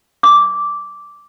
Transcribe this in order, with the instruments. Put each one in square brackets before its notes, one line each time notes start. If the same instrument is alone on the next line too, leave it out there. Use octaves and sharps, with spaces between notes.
[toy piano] D6